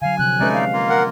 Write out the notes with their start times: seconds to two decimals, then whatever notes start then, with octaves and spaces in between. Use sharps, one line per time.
0.02 D3 F#3 F5 G#5
0.18 C3 F3 C4 F#6
0.40 G#3 A3 C#4 D#4 B4 D5
0.53 F5
0.73 A#3 F4
0.90 A#4 F#5